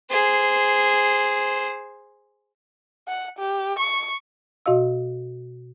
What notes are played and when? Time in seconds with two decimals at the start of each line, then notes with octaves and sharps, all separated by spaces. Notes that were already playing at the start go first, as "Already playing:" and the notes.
0.11 G#4 C5
3.08 F#5
3.39 G4
3.79 C#6
4.66 B2 F#4 D#5 F5 E6